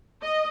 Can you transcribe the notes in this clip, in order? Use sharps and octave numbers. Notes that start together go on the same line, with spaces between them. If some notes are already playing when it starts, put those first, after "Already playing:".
D#5